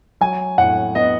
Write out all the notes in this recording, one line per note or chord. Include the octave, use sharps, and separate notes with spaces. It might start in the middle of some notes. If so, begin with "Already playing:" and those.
F#3 G#5
A2 F#5
B3 D#5